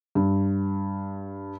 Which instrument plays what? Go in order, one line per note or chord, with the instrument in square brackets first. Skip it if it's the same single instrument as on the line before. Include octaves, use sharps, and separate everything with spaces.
[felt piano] G2